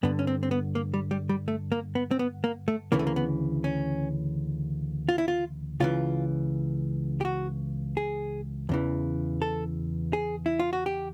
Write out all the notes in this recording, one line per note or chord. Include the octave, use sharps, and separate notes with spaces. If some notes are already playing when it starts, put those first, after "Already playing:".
G2 D3 B3
C#4
C4
C4
B3
A#3
G3
G3
G3
A3
A#3
B3
C4
B3
A#3
A3
D2 C#3 E3 A#3
A3
A#3
B3
C#4
F4
E4
F4
C#2 C#3 E3 F4
G4
F#4
G#4
E2 C#3 E3
A4
G#4
E4
F4
F#4
G4